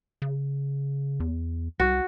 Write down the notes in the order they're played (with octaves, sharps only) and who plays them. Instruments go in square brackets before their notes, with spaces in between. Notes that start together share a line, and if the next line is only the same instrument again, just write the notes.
[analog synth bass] C#3
E2
[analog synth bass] C2 [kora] F#4